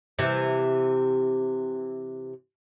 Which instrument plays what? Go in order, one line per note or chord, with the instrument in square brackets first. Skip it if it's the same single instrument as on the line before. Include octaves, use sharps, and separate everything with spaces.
[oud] C3 E3